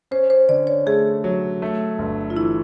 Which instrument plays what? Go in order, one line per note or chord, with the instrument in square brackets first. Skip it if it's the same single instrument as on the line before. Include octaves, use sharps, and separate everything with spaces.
[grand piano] C#4 [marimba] C5
[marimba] C5
[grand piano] D3 [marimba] D5
[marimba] C#5
[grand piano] A3 [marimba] G#4
[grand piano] F#3
A3
G1
[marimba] F4
[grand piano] E3 [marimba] E4